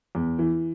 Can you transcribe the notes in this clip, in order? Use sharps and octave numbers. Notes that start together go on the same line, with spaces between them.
E2
E3